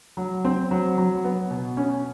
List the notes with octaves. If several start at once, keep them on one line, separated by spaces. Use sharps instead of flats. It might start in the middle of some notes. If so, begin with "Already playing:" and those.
F#3
C4
F#3
F#3
B3
B2
C#4